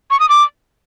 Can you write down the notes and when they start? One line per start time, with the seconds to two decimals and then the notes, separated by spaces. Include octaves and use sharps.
0.11 C#6
0.20 D#6
0.29 D6